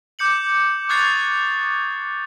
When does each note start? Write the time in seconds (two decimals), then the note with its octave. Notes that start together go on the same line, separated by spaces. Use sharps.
0.19 D6 G6 C#7 F#7
0.89 C#6 D#6 F#6 G#6 A6 C7